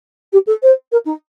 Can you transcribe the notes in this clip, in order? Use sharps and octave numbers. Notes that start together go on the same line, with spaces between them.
G4
A4
C5
A#4
D#4